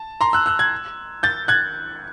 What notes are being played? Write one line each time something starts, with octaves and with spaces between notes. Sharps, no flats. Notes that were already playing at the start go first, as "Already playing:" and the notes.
Already playing: A5
A#5 C6
E6 F#6
E6 F#6
F#6 G#6
G6 A6
F#6 G#6